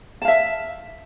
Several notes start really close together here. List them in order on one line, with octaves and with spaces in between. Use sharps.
A5 F5 E5